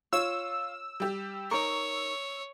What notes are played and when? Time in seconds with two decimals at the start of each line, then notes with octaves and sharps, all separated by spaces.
0.13 F4 C#5 E6
1.00 G3 G4
1.51 D#4 A#4 C#5 C#6